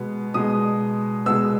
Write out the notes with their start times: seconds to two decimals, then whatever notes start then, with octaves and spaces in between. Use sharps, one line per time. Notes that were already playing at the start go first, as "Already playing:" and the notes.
Already playing: B2 G#3 B3
0.34 B2 G#3 B3 D#6
1.26 B2 G#3 B3 E6